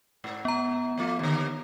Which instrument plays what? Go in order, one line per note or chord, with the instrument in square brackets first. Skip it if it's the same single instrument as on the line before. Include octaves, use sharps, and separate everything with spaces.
[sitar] G#2
[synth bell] B3 A#5
[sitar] F3 A3 F4
D#2 D3